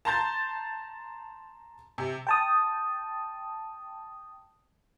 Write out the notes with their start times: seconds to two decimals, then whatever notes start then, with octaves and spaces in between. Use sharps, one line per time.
0.05 A5 A#5 C6 G6 A6
1.98 C3
2.27 G5 A5 D#6